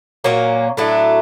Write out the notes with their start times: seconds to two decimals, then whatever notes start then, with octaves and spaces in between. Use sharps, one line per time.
0.24 A#2 F#3 A#3 C#4
0.77 A2 F#3 A3 D4